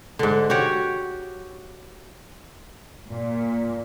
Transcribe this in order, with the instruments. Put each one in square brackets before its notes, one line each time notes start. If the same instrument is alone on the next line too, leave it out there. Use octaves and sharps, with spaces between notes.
[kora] G#2 D3
F#4 G4 C#5
[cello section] A#2